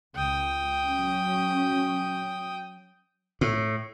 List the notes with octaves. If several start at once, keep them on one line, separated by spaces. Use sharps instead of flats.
C#2 G5 D#6
F#3 C#4
A2